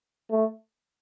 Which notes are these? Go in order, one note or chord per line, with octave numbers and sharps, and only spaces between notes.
A3